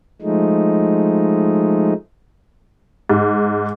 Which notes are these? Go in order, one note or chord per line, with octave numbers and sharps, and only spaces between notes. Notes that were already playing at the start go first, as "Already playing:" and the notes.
F3 G#3 A3 D#4
G#2